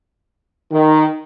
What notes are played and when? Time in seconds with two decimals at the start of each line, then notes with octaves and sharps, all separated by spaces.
0.72 D#3